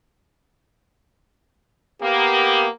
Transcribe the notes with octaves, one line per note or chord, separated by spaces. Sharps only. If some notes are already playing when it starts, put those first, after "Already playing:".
A#3 B3 G4